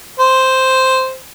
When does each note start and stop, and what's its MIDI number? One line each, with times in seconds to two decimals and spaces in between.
0.20 1.15 72